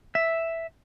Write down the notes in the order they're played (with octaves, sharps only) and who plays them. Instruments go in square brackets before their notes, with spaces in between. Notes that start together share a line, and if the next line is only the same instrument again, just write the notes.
[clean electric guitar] E5